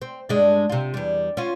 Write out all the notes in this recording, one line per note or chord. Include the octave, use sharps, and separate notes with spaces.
C4
G2 G#3 D4
C3 F4
E2 G3
C#4 F4